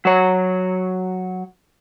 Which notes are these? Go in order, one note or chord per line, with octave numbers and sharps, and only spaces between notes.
F#3 C#5